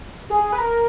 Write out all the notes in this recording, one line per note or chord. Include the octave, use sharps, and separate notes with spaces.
G#4
B4
A#4